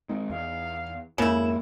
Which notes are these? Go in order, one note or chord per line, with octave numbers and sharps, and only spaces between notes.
G#3 C4 D#4
E2 F5
F2 G#2 C#3 A#3 E4 E7